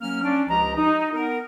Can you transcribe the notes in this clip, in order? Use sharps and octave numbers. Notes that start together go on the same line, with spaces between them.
F#3 A#3 C#4 F6
C#4 D4
C#2 F3 G4 D#5 A#5
D#4
B3 A#4